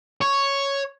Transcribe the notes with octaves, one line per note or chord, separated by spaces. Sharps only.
C#5